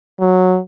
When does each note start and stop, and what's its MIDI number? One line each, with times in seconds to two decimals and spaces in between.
0.20 0.59 54